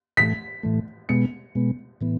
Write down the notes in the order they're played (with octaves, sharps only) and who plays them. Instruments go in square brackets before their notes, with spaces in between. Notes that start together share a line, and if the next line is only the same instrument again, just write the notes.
[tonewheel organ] A2 E3 A3 [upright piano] B6
[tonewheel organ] A2 E3 A3
[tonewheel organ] B2 G#3 B3 [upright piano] C#7
[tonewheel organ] B2 G#3 B3
A2 E3 B3